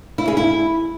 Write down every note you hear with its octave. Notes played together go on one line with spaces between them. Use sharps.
E4
G#4
E4